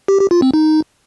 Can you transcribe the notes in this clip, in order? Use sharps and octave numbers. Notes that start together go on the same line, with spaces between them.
G4
G4
F4
C4
D#4